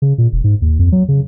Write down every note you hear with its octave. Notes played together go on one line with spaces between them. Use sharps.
C#3
A#2
E1
G#2
D#2
F2
F#3
C#3